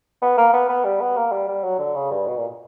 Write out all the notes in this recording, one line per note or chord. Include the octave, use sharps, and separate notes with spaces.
B3
A#3
B3
B3
G3
B3
A#3
G3
G3
F#3
D3
C#3
G2
B2
A#2